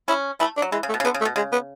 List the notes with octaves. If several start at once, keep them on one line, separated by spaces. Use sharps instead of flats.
C#4 E4
A3 E4
D4
F#3
E3 G#3
C#3
A3
B2
C#3
D3 B3
C#3
A3
B2
C#3 G#3
B3